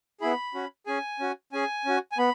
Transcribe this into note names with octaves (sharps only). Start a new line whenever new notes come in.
B3 E4 G#4 B5
C#4 F#4
C#4 G#4 G#5
C#4 F#4
C#4 G#4 G#5
C#4 F#4
G#5
B3 B5